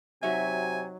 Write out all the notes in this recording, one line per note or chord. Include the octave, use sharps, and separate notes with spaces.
C3 F#3 D#4 F#4 E5 G#5